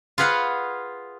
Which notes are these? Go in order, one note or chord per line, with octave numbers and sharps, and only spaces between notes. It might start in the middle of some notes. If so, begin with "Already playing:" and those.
F4 G#4 B4 F5 F#5